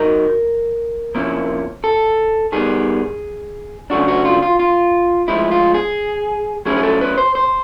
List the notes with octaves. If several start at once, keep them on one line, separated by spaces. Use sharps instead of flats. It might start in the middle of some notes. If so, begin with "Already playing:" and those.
Already playing: F#3 D#4 A#4
C3 F3 A#3 C#4 E4
A4
D#3 G3 B3 G#4
C#3 F#3 A3 D4 F#4
F#4
F4
F4
F4
A2 F3 G#3 E4
F4
G#4
F#3 A3 C#4 E4 G#4
G#4
A4
B4
C5
C5